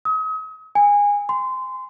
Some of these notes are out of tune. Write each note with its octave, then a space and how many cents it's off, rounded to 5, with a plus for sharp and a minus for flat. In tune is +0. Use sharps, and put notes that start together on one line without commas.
D#6 +40
G#5 -20
C6 -25